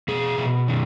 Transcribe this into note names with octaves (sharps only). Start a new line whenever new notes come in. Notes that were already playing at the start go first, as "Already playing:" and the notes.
B2 G#4
B2
D#3